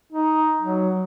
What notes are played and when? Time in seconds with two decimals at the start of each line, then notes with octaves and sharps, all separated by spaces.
0.13 D#4
0.62 F#3